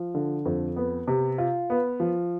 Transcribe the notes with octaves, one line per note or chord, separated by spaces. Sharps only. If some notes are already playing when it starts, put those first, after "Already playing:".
Already playing: F3
D3
F2
B3
C3
F4
B3
F3